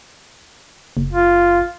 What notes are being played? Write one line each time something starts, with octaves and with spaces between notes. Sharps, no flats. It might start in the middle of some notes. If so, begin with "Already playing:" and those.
F#1
F4